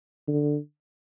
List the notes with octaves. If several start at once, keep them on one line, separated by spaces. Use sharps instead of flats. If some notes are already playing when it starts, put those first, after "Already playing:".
D3